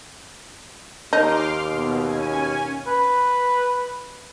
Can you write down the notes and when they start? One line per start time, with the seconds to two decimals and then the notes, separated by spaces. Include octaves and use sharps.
1.13 D#2 D#4 C6 D6 F6
1.67 B2
2.04 C#4 G#5
2.87 B4